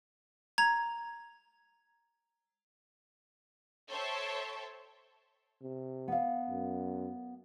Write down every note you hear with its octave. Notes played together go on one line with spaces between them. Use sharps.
A#5 G#6 F7
A4 C5 C#5 E5 G5 A5
C3
B3 F5
F#2